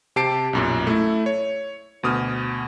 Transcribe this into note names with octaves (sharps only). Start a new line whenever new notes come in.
C3 G4 A5 C7 D7
B1 F#2 A#2
A3 E4
C#5
D2 B2 D#6 F6